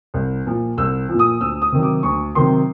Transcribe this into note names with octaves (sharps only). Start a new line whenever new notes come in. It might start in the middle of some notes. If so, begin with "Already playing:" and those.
C2
A#2 F3
C2 E6
F3
A#2
D#6
D2 E6
D#6
C3 D#3 F#3
D6
D2 C#6
C3 D#3 F#3 C6